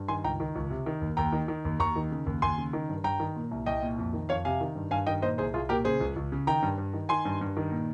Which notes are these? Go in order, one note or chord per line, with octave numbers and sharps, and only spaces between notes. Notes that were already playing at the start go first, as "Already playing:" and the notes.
Already playing: G2
D#3 G#5 C6
C#2 G5 A#5
D#3
C#2
C3
D#3
D#2
D#2 G5 A#5
D#3
D#3
D#2
D#2 A#5 C#6
D#3
C#3
D#2
D#2 G#5 C6
C#3
D#3
G2
G2 G5 A#5
D#3
A#2
C2
C2 D#5 G5
A#2
F2
D#3
F2 C#5 F5
C3 F5 G#5
D#3
G2
G2 F5 G#5
D#3 D#5 G5
A#2 C5 D#5
C2 G#4 C5
C2 F4 G#4
A#2 G4 A#4
C#3 G#4 C5
C#2
C#2
C#3
D#3 G5 A#5
G2
G2
D#3
D#3 G#5 C6
G2
G2
D#3
A#2